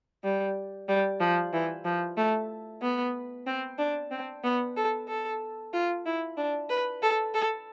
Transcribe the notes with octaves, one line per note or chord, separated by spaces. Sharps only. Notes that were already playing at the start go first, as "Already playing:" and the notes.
G3
G3
F3
E3
F3
A3
B3
C4
D4
C4
B3
A4
A4
F4
E4
D4
B4
A4
A4